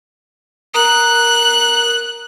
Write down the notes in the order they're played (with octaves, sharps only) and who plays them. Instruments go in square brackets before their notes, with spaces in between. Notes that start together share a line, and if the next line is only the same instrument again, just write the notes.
[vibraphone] A#4 A#5 D#6 [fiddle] F#6